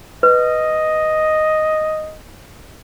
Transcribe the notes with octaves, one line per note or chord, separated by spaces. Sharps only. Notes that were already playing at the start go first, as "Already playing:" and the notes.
B4 D#5